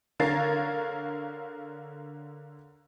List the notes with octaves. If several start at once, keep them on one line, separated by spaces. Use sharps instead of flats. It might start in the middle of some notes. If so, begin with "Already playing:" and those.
D3 A#4 C#5 F5 A6 C7